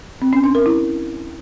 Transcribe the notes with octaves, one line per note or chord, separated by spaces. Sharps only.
C4
C#4
D4
A#4
E4